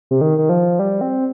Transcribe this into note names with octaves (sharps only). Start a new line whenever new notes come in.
C3
D#3
D#3
F3
G3
C4